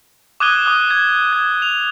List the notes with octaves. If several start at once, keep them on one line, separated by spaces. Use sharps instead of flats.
D6 D#6 F#6 G#6 D#7 G7
D6 D#6
G#6
G#6
F7